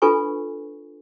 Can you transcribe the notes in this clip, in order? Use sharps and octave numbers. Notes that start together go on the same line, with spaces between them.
D4 F4 A4 B4 G#5 C#6